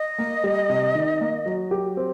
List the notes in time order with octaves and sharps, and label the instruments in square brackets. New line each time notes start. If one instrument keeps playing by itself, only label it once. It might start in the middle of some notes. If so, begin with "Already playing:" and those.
Already playing: [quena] D#5
[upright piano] A#3
G3
C3
D#3
A#3
F#3
G4
C4